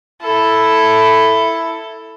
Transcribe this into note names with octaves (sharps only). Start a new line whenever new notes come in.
E4 A4